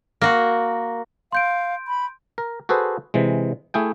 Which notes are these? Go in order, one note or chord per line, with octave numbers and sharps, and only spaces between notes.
A#3 F#4
F5 C6 G6 D7
B5
A#4
F#4 G#4 A4 B4 C5
C3 E3 G#3
A3 E4 G#4 G5